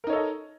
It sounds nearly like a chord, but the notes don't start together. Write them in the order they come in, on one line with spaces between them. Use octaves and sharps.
A#4 D#4 C#5 A4 D#5